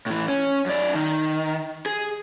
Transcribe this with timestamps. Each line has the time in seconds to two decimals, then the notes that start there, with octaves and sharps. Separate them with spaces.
0.06 A2 E3
0.28 C#4
0.66 F#2 D5
0.94 D#3
1.86 G#4